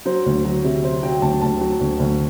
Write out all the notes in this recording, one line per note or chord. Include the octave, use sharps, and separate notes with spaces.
F#3 C5
D2
F#3
C3
C3 C5
F#3 G5
D2 A5
D2 A5
F#3
D2
D2